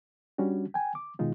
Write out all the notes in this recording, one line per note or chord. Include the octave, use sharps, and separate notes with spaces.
G3 C#4 D4 F#4
G5 G#5
D6
B2 D#3 G#3 D#4 F4